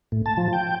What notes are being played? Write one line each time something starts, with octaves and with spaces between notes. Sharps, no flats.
A2
A5
F3
G5